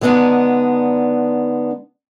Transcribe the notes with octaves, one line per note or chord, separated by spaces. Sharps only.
D3 G#3 B3 D4 D#4